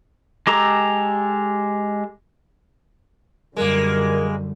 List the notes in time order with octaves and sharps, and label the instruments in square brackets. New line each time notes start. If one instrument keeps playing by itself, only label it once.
[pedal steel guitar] G#3 G4 A4 A#5
[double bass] F#2 D3 [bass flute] G3 [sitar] G#3 A#3 [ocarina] A#4